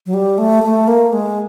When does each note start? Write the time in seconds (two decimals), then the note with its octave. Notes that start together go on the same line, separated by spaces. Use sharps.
0.06 F#3
0.14 G3
0.38 A3
0.63 A3
0.88 A#3
1.13 G#3